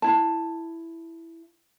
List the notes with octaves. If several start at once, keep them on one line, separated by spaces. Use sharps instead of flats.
E4 A5